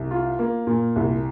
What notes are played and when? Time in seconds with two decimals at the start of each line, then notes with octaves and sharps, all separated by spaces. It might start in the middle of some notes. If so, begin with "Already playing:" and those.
Already playing: C2
0.11 F4
0.39 A#3
0.67 A#2
0.96 C2